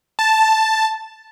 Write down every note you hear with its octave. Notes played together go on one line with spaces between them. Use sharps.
A5